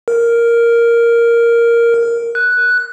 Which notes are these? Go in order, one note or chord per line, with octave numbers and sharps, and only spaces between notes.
A#4
F#6